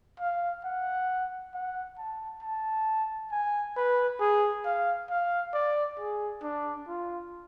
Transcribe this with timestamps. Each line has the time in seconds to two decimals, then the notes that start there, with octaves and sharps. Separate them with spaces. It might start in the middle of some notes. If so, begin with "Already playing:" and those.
0.20 F5
0.65 F#5
1.54 F#5
1.98 A5
2.42 A5
3.31 G#5
3.76 B4
4.20 G#4
4.65 F5
5.10 F5
5.54 D5
5.98 G#4
6.43 D4
6.88 F4